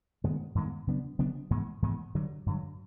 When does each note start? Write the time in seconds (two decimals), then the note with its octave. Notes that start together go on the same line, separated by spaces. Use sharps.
0.24 G2 D#3 G#3 B3
0.55 G2 D#3 G#3 B3
0.87 C#3 F#3 B3 D4
1.19 C#3 F#3 B3 D4
1.51 G#2 E3 G#3 B3
1.82 G#2 E3 G#3 B3
2.15 G2 D3 F#3
2.46 G2 D3 F#3